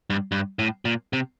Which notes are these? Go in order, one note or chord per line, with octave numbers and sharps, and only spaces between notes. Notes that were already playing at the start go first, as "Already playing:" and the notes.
G2
G2
A2
A#2
C3